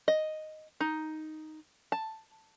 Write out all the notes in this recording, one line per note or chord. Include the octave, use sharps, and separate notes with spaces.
D#5
D#4
A5